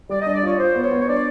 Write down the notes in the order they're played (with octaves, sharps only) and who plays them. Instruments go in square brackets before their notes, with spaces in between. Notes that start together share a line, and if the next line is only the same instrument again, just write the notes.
[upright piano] G3 [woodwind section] D5
[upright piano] D4 [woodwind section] D#5
[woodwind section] D5
[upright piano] F4 [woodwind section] C#5
[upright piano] F4 [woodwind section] C5
[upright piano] B3
[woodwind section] C#5
[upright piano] B3
[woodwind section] C#5
[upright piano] D4 [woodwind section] D5